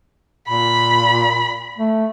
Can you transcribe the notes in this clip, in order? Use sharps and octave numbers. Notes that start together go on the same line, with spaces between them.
A#2 B5
A3